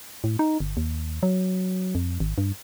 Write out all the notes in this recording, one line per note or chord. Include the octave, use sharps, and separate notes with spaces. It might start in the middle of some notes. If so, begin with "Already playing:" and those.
A2
D#4
G1
D#2
F#3
F2
G#1
G2